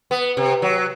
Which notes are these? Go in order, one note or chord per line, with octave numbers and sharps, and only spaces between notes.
B3
C3
F#3